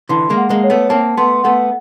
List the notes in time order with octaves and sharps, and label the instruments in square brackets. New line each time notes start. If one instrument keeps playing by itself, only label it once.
[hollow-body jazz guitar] D3 E3 [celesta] C6
[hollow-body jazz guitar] G#3 A#3
[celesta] F#5
[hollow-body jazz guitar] G#3 A#3
[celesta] C#5
[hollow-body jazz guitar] A3 B3
[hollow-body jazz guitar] A#3 C4 [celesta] A5
[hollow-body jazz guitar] A3 B3 [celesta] C6
[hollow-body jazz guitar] A3 B3 [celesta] F#5